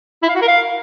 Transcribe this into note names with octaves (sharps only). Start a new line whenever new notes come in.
E4
F5
F#4
A#4
F5